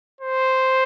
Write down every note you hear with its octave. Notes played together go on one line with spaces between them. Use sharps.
C5